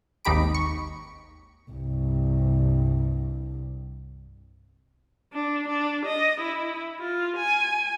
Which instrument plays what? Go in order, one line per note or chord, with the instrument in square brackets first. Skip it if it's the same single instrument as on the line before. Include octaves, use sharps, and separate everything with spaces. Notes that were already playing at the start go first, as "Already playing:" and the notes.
[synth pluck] G#1 D#2 D#4 G4 B5 D7
C#6
[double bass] C2 G2
[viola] D4
D4
D#5
E4
F4
G#5